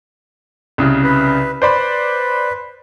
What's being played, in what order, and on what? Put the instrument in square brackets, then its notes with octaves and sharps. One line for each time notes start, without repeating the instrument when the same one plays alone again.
[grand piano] C2 C#3
[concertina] B4
[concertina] B4 [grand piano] C5 D5 B5